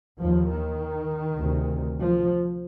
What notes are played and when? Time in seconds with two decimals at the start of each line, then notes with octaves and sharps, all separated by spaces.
0.19 D#2 F3
0.49 D#3
1.38 D2 C3
1.98 F3